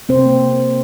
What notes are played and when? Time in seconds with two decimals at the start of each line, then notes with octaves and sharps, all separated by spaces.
0.09 C3 C4 C5
0.26 A#3